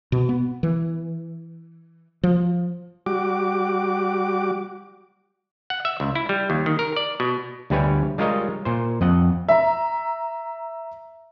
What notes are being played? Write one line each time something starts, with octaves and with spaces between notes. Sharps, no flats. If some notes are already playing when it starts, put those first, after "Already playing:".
B2
B3
E3
F3
G3 F#4 D6
F#5
E5
C#2
E4
G3
D#2
D#3
A#4
D5
B2
D2 G3 G4 B4 C#5 G#5
G3 G#3 F4 A#4 C#5 D#5
A#2 C5
F2 D#5 F#5
E5 A#5